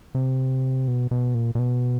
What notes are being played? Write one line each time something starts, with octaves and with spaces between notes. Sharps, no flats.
C3
B2
B2
A#2
A#2
B2